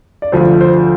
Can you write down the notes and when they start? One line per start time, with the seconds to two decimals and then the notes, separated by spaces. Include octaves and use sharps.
0.22 D5
0.32 D2 D3 F3 C5
0.61 C5